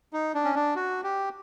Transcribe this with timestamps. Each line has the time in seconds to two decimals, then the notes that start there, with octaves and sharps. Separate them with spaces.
0.13 D#4
0.34 D4
0.45 C#4
0.55 D4
0.76 F#4
1.04 G4